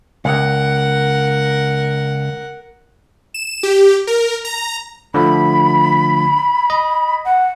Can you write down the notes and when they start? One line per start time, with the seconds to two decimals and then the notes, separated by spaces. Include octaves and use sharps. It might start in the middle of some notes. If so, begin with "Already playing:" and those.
0.25 C#2 A#4 F#5
3.34 E7
3.63 G4
4.07 A#4
4.45 A#5
5.14 D3 F3 A3 B5
6.70 D#5
7.25 F#5